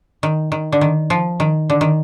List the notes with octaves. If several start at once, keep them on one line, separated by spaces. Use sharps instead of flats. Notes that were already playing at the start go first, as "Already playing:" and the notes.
D#3
D#3
D3
D#3
F3
D#3
D3
D#3